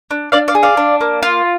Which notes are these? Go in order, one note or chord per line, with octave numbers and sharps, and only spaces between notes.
D4
D4 D5 F5
D5 F5
G#4
D5 F5
D4
A#3
F4